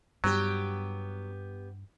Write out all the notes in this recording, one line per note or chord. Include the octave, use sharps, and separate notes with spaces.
G2 F#3 B3 G4